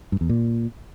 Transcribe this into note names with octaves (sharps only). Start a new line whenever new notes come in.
G2
E2
A#2